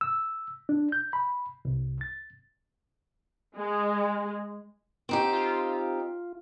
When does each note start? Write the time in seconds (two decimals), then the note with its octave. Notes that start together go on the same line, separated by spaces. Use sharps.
0.01 E6
0.69 D4
0.92 G6
1.13 B5
1.65 C2
2.01 A6
3.56 G#3
5.09 C4 D#4 G4
5.33 F4